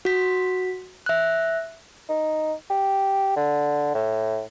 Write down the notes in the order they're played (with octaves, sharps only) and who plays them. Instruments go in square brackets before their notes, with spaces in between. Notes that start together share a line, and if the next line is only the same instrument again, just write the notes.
[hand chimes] F#4 B6
E5 F#6
[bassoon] D#4
G4
D3
A2